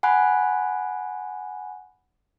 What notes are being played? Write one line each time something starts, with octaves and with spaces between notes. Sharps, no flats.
F#5 G#5 B5 F#6